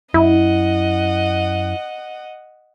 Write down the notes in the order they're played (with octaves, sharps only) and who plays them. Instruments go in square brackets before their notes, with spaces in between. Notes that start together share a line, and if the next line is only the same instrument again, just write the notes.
[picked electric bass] F#2 [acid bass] E4 [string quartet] D#5 F#5